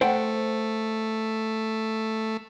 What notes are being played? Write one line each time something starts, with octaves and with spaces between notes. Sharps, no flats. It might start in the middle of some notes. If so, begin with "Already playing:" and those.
A3 C5 F#5 G5